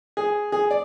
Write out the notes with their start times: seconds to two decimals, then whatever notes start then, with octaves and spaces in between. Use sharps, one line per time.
0.17 G#4
0.52 G#4
0.71 D5